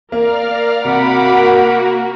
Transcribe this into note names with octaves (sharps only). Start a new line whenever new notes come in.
A#3 A#4 D5 F5 F6
C3 A#3 F#4 F#5 B5 D6